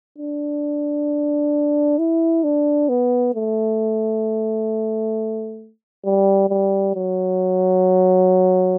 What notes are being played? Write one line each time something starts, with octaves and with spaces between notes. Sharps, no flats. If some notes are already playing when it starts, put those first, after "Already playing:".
D4
E4
D4
B3
A3
G3
G3
F#3